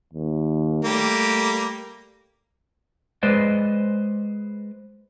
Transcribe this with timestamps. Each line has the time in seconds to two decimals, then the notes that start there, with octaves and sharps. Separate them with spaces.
0.13 D#2
0.85 G3 A3 A#3 G4
3.23 G#3 B4 C5 D5 D#5